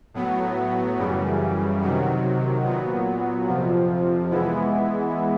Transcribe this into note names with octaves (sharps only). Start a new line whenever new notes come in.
A2 F#3 B3
F#2 C#3 E3 G3
C3 D#3 F#3
A#2 F#3 B3
F2 C3 F3
E3 G#3 B3 E4